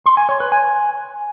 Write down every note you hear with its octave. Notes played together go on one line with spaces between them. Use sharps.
C6
G#5
C#5
B4
G#5